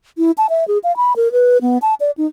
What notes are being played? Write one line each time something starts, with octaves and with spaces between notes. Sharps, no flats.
E4
A5
E5
G#4
F5
B5
A#4
B4
B3
A5
D5
D#4